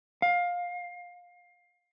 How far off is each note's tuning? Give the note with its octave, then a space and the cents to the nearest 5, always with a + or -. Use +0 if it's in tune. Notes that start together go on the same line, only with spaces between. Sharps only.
F5 +20